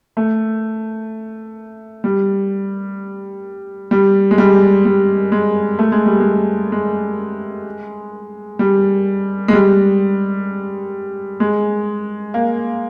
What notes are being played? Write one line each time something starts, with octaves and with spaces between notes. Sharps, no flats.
A3
G3
G3
G#3
G3
G3
G#3
A3
G#3
G3
G#3
G#3
G3
G#3
G3
G#3
A#3